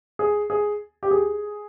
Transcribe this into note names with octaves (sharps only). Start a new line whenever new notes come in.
G#4
G#4
G4
G#4